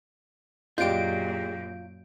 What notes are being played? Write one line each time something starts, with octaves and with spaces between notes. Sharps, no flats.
F#2 A#2 G#3 D4 F4 G4 G6 D7